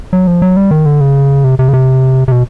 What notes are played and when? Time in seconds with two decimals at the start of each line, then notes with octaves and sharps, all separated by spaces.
0.13 F#3
0.27 F3
0.42 F#3
0.57 G3
0.71 D#3
0.86 D3
1.01 C#3
1.44 C3
1.59 C3
1.68 C#3
1.73 C3
2.28 C3
2.32 B2